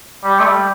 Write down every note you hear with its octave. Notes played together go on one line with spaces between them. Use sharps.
G3
A3
G3